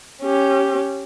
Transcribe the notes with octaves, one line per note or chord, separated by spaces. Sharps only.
C#4 G4